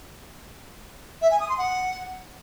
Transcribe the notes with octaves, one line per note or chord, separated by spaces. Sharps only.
E5
G#5
D#6
C6
F#5